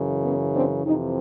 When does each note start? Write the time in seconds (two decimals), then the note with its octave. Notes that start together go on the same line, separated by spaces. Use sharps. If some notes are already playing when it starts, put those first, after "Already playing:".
Already playing: F#2 C#3 E3
0.24 B3 C#4
0.54 C4 D4
0.84 F2 C3 E3 C#4 D#4